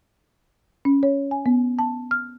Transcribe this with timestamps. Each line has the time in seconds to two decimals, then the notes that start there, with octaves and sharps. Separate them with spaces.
0.85 C#4
1.03 C#5
1.31 G#5
1.46 B3
1.79 A5
2.11 F6